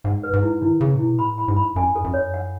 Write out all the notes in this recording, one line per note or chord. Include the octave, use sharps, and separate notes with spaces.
G#2 F#5
B4
G#2
E4
D#3 E4
C#3 G#4
A2
B2 E4
A2 B5
B5
G#2
B5
F#2 G#5
A4
F#2
C#5
F#5